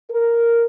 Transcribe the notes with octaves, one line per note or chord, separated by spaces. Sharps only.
A#4